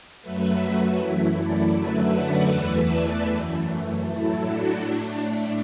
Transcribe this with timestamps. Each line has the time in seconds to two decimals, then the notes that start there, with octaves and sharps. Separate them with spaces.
0.22 F#2 F#3 A3 B4 E5
0.60 F#4 B4
0.98 F#2 E3 A3 E4
1.36 A4 D5
1.74 F#2 D3 F#3 A3 B4 E5
2.12 D5 F#5
2.50 E2 E3 A3 B4 E5
2.88 A4 D5
3.27 F#2 E3 A3
4.02 A2 F#3 A3 E4 A4
4.40 D4 F#4
4.79 A2 A3 D4